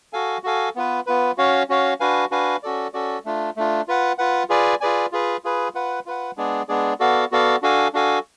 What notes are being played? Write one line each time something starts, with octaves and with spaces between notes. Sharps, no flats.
F#4 A4 F5 G#5
F#4 A4 F5 G#5
B3 F4 B4
B3 F4 B4
C#4 F#4 C#5 F5
C#4 F#4 C#5 F5
D4 F#4 B4 F5 G#5
D4 F#4 B4 F5 G#5
C#4 F#4 A4 D5
C#4 F#4 A4 D5
A3 D4 F4
A3 D4 F4
F4 B4 F#5
F4 B4 F#5
F4 G#4 B4 D5 G#5
F4 G#4 B4 D5 G#5
F4 G#4 B4
F4 G#4 B4
F4 B4 F#5
F4 B4 F#5
G#3 B3 D4 G#4 D5
G#3 B3 D4 G#4 D5
B3 F#4 A4 D5 F5
B3 F#4 A4 D5 F5
D4 F#4 A4 F5 G#5
D4 F#4 A4 F5 G#5